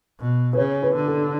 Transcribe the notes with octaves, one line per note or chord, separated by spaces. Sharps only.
B2
B4
C#3 C#5
B4
D3
A4